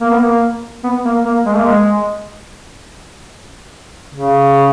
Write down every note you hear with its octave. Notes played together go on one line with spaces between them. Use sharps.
A#3
B3
A#3
B3
A#3
A#3
G#3
A#3
G#3
C#3